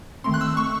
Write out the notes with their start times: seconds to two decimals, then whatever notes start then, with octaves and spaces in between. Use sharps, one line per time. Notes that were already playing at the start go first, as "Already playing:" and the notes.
0.24 D#3 A3 C4 C6
0.34 F#6
0.41 E6
0.57 C#6